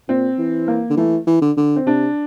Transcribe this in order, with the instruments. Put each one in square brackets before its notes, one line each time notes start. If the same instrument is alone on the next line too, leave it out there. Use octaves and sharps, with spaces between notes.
[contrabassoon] A#2 [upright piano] C4
[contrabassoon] E3
[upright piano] A#3
[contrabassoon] D3
[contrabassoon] E3 [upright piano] A3
[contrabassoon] E3
D3
D3
[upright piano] C4
[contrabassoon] C3 [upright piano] D4